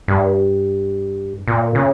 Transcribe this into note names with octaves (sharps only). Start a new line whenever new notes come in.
G2
A#2
C#3